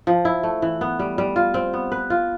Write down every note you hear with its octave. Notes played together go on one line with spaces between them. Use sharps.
F3
E4
A3
E3
B3
G3
G3
F4
C4
B3
B4
F4